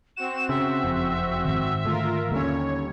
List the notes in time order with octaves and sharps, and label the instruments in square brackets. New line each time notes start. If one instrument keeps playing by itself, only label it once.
[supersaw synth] C4 F#4 [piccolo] E7
[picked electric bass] C#3 [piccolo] E5
[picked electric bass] F#1 F2
[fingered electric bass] G#2 D#3
[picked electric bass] D3 A3 [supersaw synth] F4 A#4
[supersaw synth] D#2 C#5 [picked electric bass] D3 G3 C#4 [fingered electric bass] A#3